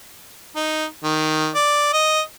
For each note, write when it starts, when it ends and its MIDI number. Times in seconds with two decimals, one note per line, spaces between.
0.56 0.85 63
1.04 1.49 51
1.55 1.90 74
1.93 2.21 75